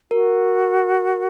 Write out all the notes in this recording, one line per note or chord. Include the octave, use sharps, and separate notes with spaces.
F#4 A#4